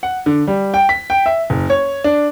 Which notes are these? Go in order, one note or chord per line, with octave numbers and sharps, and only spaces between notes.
F#5
D3
G3
G5
B6
G5
E5
F#1
C#5
D4